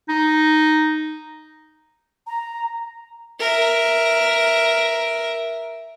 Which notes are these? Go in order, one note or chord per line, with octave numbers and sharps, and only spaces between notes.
D#4
A#5
A#4 E5